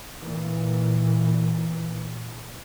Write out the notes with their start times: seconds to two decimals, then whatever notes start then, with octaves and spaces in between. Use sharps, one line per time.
0.20 A#2 E3